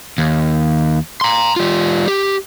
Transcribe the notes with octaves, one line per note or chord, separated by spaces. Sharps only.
D#2
A#5 C6
G3 F4
G4